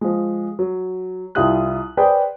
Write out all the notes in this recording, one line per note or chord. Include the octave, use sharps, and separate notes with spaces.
F3 G#3
F#3
C2 E4 F4 G4 D#6 F#6
G#4 B4 C5 D5 G5